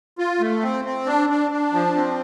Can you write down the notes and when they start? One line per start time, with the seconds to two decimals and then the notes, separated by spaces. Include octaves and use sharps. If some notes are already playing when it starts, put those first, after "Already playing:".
0.18 F4
0.40 A3
0.62 C4
0.85 C4
1.06 D4
1.29 D4
1.51 D4
1.73 F3
1.96 C4